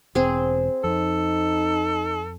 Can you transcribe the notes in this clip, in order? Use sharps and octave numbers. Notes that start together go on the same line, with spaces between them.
E1 C4 G#4
F2 D#4 A4